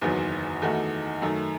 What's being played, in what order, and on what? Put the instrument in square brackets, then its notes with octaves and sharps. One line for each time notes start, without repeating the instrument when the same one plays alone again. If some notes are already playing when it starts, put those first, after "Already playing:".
[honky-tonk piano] F#1 E2 D#3 F#3 B3
E2 D#3 A3 D#4 F#4
F#2 D#3 A3